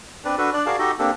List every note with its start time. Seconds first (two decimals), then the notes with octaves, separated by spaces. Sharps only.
0.25 C4 D4 B4 D5
0.38 D4 F#4 A4 B4
0.53 D4 D5 F#6
0.66 F#4 G#4 A#4 D5 F5 A5
0.79 D#4 F#4 G4 A4 D#5
0.99 A#3 C4 D4 G4 A4